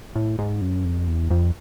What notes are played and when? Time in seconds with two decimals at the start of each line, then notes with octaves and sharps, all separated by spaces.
0.15 A2
0.39 G#2
0.61 F#2
0.85 F2
1.08 E2
1.30 F2